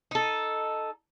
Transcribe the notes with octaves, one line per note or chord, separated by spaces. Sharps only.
D#4 A4